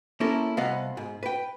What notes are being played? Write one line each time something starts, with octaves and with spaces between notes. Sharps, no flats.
A#3 C#4 E4 A4 A#4
C2 B3 D#5 F5 F#5
G#2
B4 G5